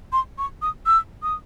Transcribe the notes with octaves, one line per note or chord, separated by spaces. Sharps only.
C6
C#6
D#6
E6
D#6